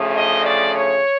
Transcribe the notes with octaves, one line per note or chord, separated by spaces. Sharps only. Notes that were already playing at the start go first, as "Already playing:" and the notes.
Already playing: D2 C#3 F3 A3
D#5
D5
C#5